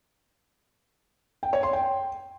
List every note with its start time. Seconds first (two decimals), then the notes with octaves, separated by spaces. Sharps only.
1.43 G5
1.53 C#5
1.63 C6
1.73 G5